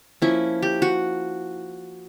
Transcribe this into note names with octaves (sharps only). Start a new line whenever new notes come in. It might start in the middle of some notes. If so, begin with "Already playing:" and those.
F3 A#3 C#4 E4
G4
F#4